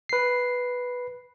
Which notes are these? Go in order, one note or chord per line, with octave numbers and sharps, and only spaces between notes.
B4 C7